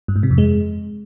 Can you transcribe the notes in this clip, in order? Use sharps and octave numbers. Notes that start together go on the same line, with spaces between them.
G2
G#2
C3
F2
G#3